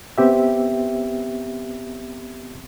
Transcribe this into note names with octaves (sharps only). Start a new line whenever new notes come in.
B3 C4 G4 E5